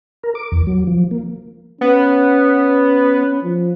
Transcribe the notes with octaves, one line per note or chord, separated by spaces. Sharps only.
A#4
D6
E2
F#3
F3
A#3
B3 C#4
F3